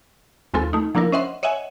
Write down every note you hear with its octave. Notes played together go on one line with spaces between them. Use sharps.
D#2 G#3 C4 F4 A4
A3 D#4
F3 A#3 D4 E4 A#4
C#4 C5 D#5 E5 F#5 C6
C#5 D#5 E5 F#5 G#5